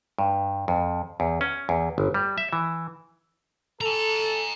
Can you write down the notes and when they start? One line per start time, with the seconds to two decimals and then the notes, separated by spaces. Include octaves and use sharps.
0.18 G2
0.68 F2
1.20 E2
1.41 C#4
1.69 E2
1.98 G1
2.14 G3
2.38 E5
2.53 E3
3.81 A4 G#5 A#5